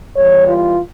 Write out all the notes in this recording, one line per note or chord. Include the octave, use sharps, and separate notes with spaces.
E2 E3 G3 C#5
F4